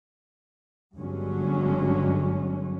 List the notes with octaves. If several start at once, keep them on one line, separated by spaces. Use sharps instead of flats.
G1 G2 D3 F#3 G#3 C#4